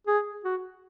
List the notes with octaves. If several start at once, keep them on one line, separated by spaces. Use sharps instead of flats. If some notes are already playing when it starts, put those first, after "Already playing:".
G#4
F#4